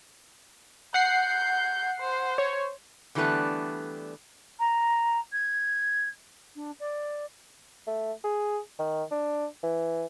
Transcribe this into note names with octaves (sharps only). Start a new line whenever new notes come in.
F#5 G6 C7
C5
C#5
D3 E3 G3 A3 B3 D4
A#5
G#6
D4
D5
A3
G#4
D#3
D4
E3